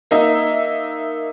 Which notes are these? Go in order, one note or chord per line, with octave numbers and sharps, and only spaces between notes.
A#3 D#4 E5